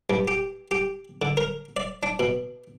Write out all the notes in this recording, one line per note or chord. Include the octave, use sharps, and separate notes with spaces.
G2
G4
G4
D3
A#4
D5
D4
B2